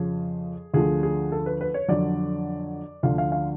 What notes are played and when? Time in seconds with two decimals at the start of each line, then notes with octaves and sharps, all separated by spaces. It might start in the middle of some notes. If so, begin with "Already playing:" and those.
Already playing: F2 C#3 F3 G#4
0.74 D2 D3 F3 G#4
1.03 G#4
1.32 A4
1.46 B4
1.61 B4
1.74 C#5
1.88 F2 D3 F#3 D5
3.03 D2 D3 F3 F5
3.18 F5
3.32 F5